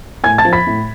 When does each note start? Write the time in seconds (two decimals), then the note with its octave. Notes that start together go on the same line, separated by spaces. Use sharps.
0.24 A2 G#5 G#6
0.38 A5 A6
0.45 F3
0.53 B5 B6
0.67 A2